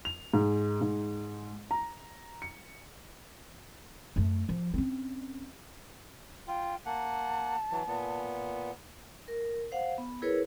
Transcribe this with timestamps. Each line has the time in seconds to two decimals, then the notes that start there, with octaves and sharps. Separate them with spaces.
0.05 F7
0.34 G#2
0.81 G#2
1.71 A#5
2.42 C#7
4.16 F#2 A3
4.49 F3
4.74 C4 C#4
6.48 F4 G5
6.86 A#3 F#5 A5
7.72 E3 F#3
7.88 A#2 B3
9.28 A#4
9.72 C5 F5 F#5
9.98 B3
10.22 E4 G#4 A#4 B4 C#5